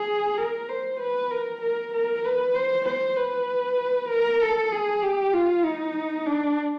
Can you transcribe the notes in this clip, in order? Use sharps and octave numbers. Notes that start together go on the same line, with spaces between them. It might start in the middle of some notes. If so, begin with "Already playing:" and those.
Already playing: G#4
A#4
C5
B4
A#4
A#4
A#4
B4
C5
C5
B4
A#4
A4
G#4
G4
F4
D#4
D4